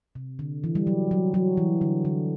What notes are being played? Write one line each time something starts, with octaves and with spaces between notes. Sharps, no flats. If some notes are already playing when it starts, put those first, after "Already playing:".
C3
D3
E3
G3
F#3
F#3
F#3
E3
D3
D3